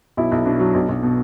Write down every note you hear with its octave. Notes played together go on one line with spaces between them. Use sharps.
B1 E4
B1
B2 D4
F#3
B1
B1
B2